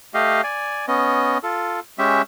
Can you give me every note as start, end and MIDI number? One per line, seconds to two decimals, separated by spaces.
0.14 0.42 57
0.14 0.42 67
0.14 0.42 75
0.14 0.42 77
0.44 0.86 74
0.44 0.86 80
0.88 1.38 59
0.88 1.38 61
0.88 1.38 75
1.43 1.80 65
1.43 1.80 69
1.99 2.22 56
1.99 2.22 61
1.99 2.22 67
1.99 2.22 76